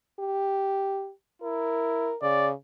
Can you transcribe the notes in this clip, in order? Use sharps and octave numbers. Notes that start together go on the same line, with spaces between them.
G4
E4 A#4
C#3 D5